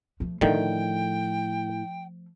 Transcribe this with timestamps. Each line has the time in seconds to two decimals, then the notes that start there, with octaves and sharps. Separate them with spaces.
0.20 F3 A3
0.41 A2 D3 D#3 F3 A3 G5